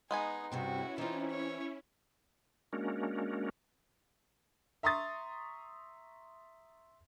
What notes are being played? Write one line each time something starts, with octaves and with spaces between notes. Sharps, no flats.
G#3 B3 D#4 G#4 G#5
G2 C3 C4 C#4 E4 F#4
E3 C4 D#4 F4
C#5
G#3 A#3 C#4 D4 F#4 A#4
E5 A#5 C6 C#6 D#6 A6